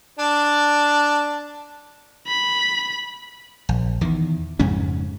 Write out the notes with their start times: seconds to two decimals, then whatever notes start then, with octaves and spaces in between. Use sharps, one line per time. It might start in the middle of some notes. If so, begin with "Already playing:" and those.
0.19 D4 A5
2.27 B5
3.69 A#1
4.01 E2 D#3
4.59 F2 G#2 C#3 C#4